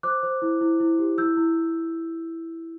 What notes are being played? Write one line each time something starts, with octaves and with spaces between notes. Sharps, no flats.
C5 D6 F#6
C5
E4
E4
E4
G4
E4 E6 G6
E4